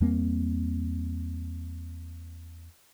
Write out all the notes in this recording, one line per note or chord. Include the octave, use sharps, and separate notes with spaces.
E2 G3 A#3 C4